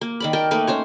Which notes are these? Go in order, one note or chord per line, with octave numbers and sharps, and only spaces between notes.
A#3
D#3 D5 B5
A#4 G5 A5
A3 A#3 D#4 B4
C#4 C5 C#5